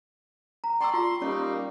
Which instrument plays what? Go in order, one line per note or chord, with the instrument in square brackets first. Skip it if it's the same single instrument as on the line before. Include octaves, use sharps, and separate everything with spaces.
[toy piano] A#5
[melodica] D5 A5 C6 [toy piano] G5 C#6 E6
[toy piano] F4 [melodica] C6
[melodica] G3 A#3 D#4 [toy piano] C#4 D5 C#6